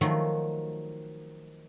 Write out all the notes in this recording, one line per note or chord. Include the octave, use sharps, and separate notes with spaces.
D#3 F3 F#3 A3